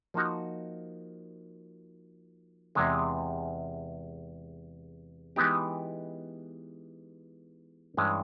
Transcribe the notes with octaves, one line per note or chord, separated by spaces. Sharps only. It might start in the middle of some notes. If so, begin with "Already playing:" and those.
F3 A#3 D#4 F#4
E2 C3 E3 G#3
E3 G#3 B3 D#4 G4
G2 E3 G#3 C#4